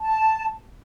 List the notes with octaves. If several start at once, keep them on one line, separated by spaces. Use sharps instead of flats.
A5